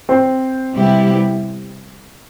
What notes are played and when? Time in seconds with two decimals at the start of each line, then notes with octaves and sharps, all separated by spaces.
0.09 C4 C5
0.75 C3 G3 B3 E4 G4